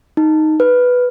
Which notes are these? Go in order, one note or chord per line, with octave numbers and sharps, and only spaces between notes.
D#4
B4